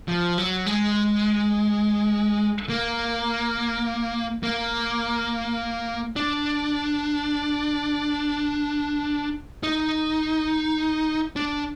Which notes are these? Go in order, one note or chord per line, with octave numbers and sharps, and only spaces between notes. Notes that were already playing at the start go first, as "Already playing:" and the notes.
F3
F#3
G#3
A#3
A#3
D4
D#4
D4